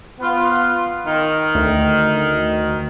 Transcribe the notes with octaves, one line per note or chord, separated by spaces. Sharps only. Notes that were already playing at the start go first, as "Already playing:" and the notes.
B3 F4
D#3
D2